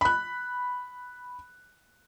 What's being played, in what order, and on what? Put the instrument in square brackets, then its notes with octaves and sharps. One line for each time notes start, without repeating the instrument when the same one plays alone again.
[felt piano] B5 F#6